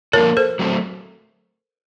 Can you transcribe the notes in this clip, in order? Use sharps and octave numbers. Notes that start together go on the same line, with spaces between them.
F3 A#3 F4 A4 A#4 C#5
A4 C5
F#3 A3 C4